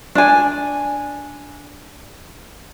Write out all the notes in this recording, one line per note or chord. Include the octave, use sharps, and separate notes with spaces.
D4 G#5